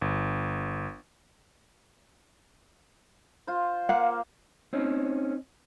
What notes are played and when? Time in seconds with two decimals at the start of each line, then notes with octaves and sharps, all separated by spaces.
0.01 G1
3.47 F4 C5
3.89 A#3 F5 F#5
4.73 C4 C#4 D#4